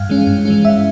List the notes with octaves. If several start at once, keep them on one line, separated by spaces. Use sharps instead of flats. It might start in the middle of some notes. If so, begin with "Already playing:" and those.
Already playing: G2 F5
E3 G#3 C#4
G2
E3 G#3 C#4
G2 E5